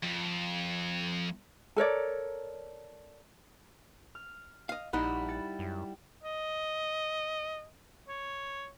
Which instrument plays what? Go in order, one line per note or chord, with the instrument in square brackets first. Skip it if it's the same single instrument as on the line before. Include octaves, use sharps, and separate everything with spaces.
[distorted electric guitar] F2
[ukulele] A4 A#4 C#5 D5
[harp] F6
[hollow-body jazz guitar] D#5 F5
[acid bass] A#1 [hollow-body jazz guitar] G3 D#4 E4 [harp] F#5 B5
[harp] A6 C#7
[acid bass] F#2
[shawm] D#5
C#5